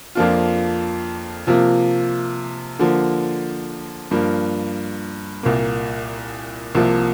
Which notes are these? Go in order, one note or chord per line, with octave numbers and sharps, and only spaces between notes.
F2 F3 A#3 D4 F4
C3 F3 A#3 F4
D3 F3 A#3
G2 F3 A#3
C2 A#2 A#3
C2 C3 F3 A#3